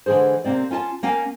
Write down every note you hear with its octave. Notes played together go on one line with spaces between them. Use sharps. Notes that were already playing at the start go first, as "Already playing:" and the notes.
D3 E3 G#3 G#4 C5
C3 A#3 C4 D5
C#4 F4 G#5 A5
A#3 C#4 F5 G5 G#5